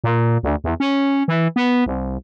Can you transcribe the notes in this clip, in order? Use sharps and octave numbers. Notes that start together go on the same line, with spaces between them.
A#2
D2
E2
C#4
E3
B3
C2